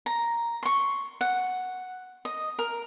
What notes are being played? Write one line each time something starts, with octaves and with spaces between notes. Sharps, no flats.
A#5
C6 C#6
F#5
D#5
A#4